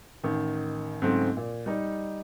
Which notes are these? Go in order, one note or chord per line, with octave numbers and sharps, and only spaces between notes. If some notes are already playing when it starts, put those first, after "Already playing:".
A1 D#3
G#2 C#3 F#3 A3 C4
A#2
G3 D#4